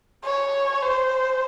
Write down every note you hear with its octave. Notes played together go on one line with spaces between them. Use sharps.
C#5
C5